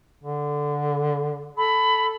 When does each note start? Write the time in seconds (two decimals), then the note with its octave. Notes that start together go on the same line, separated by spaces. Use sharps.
0.24 D3
1.57 A4 B5